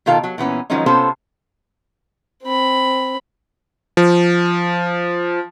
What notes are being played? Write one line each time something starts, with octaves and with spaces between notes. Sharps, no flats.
B2 D#3 F4 A4 F5
F#3
A#2 E3 B3 C#4
D#3 F3 F#3 G#3 C#4 D#4
C3 B3 C#4 F4 A4 C5
C4 B5
F3